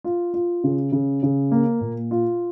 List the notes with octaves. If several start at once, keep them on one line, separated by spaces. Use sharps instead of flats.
F4
F4
C#3
C#3
C#3
A#3
A#2
F4